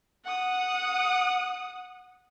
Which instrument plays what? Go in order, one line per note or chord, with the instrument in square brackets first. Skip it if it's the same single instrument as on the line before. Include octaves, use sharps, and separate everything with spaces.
[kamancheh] F#5 D#6